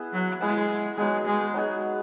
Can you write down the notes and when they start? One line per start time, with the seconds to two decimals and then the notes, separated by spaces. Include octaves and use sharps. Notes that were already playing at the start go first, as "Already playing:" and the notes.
Already playing: B3 E4 G#4 B4
0.13 F#3
0.41 G#3 B3 E4 G#4 B4
0.97 F#3 G#3 B3 D#4 G#4
1.26 G#3
1.54 F#3 B3 D#4 G#4